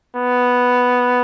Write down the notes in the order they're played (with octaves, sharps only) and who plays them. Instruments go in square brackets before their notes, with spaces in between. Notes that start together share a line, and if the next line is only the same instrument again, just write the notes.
[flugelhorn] B3